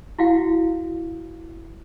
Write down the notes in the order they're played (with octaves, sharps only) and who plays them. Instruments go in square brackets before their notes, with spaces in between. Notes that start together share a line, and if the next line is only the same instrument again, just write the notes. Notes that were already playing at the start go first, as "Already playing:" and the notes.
[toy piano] E4 F#4 F5 G5